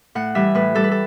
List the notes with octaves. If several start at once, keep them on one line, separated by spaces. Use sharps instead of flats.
A2 F#5
E3 G3 E5
A2 B4
E3 G3 A4
B4
A4